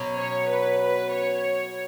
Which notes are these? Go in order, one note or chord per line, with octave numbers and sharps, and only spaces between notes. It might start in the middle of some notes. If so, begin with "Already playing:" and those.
Already playing: B2 F#3 C#4
C#5
B4
B4
C#5